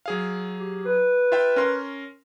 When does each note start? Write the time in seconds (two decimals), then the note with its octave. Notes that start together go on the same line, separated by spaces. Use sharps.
0.06 F#3 G#4 F5
0.60 G4
0.85 B4
1.32 F4 E5 G5
1.56 C#4 A#4 C6